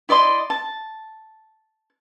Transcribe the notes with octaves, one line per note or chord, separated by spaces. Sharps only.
E4 D5 D#5 C6
A5